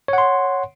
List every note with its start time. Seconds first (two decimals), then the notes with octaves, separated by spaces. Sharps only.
0.08 C#5
0.13 F#5
0.18 C6